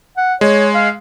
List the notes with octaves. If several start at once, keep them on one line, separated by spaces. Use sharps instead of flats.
F#5
G#3 C#5
F5